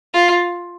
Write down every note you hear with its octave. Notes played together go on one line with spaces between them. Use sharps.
F4